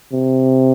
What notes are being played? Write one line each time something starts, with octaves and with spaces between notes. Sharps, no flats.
C3